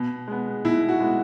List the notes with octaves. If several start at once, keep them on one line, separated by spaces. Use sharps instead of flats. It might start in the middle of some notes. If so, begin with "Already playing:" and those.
Already playing: B2
G#3 B3
B2 E4
F#4
G#3 B3